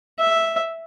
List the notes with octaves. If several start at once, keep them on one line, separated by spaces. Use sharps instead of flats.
E5